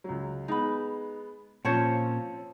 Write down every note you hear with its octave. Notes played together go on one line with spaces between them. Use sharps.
C#2 F#3
G#3 B3 D#4 B5
A#2 F3 C4 C#4 F4 C5 C#5 A5